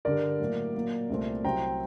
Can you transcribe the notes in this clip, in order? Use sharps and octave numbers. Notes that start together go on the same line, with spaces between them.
G2 D3 G3 A#4 D5
A2 F#3 A#3
A#2 F#3 A#3
C2 A#2 A3 C4
C2 C3 F#3 C4 G5 A#5